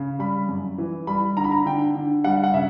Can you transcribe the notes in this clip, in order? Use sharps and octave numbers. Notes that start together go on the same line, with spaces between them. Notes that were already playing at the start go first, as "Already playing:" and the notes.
Already playing: C#3
G3 B5
F#2
E3
G3 B5
D3 A#5
B5
A#5
D3 G5
D3
G3 F#5
F#5
C#3 E5